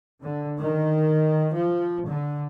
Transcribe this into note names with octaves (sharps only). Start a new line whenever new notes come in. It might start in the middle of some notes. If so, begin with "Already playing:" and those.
D3
D#3
F3
D3